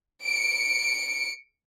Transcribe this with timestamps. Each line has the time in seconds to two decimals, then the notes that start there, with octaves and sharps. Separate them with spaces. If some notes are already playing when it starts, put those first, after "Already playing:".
0.24 C#7 D7